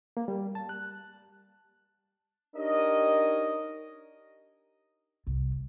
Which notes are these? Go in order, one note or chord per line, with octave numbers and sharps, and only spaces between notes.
A#3
G3
A5
F#6
D4 D#4 G4 A#4 C#5 D#5
C2